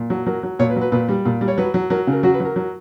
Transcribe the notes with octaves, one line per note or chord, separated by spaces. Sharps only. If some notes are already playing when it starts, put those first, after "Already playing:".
Already playing: A#2
F#3
F#3 A#4
F#3
A#2 C#5
B4
F#3
B4
A#2 B4
G3
A#2
G3
C#5
F#3 B4
F#3
F#3 A#4
C#3
A#4
F#3 F#4
B4
F#3
A#4
F#3